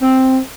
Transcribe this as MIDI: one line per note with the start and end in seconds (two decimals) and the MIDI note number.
0.01 0.38 60